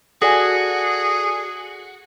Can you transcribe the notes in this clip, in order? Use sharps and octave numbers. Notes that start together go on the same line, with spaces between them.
F#4 G#4 A4 D5 G#5